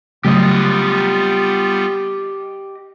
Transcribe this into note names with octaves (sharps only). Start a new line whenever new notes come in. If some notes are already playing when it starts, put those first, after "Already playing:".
C#3 F#3 G3 A3 B3 F4 G4 D#5